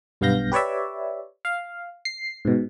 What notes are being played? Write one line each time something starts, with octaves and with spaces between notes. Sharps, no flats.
B1 G2 B3 F5 G6 A#6
G4 B4 C#5 D5 E5
F5
C7
G#2 B2